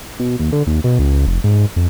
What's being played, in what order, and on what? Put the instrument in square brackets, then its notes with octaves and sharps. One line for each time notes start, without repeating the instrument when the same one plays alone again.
[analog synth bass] B2
D#2
D3
D#2
B2
C#2
F1
G#2
F2